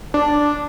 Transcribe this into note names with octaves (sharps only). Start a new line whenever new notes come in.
D4